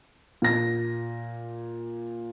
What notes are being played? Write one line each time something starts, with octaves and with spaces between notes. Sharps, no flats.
A#2 A#6